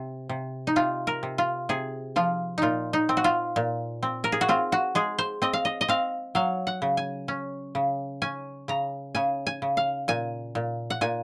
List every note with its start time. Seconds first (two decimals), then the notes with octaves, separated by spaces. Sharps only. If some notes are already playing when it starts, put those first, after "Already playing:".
Already playing: C3
0.29 C3
0.67 D#4
0.76 C3 F4
1.07 A#4
1.23 C3
1.38 F4
1.69 C3 G#4
2.16 F3 F4
2.58 A#2 D#4 F4
2.93 D#4
3.09 C4
3.17 F#4
3.24 F4
3.56 A#2
4.03 C4
4.24 A#4
4.32 G#4
4.41 F#4
4.49 C4 F4
4.72 F#4
4.95 G#3 G#4
5.19 C5
5.42 C4 D#5
5.53 F5
5.65 D#5
5.81 D#5
5.88 C4 F5
6.35 F#3 F5
6.67 F#5
6.82 C#3
6.97 G#5
7.28 C#4
7.75 C#3
8.22 C#4 G#5
8.68 C#3 A#5
9.15 C#3 G#5
9.47 G#5
9.62 C#3
9.77 F5
10.08 A#2 G#5
10.55 A#2
10.90 F#5
11.01 A#2 G#5